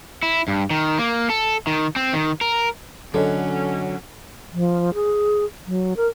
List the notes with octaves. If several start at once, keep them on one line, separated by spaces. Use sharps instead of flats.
E4
G2
D#3
A#3
A4
D#3
C4
D#3
A#4
D3 F#3 C#4 A4 C#5 D#5
F3
G#4
F#3
A#4